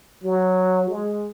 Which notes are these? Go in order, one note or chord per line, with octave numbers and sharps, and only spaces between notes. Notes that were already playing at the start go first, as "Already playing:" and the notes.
F#3
G#3